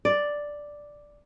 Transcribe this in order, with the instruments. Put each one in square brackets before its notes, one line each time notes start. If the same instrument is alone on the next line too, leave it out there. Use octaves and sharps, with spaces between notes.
[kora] D5